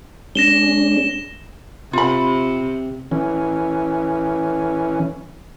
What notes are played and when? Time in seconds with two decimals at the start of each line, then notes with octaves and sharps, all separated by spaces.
0.35 G#3 C#4 D4 A#6 E7 G7
1.93 C3 F4 B5
3.11 E3 C#4